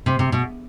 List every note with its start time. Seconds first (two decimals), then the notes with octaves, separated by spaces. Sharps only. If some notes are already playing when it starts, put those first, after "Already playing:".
0.06 C3
0.19 C3
0.32 B2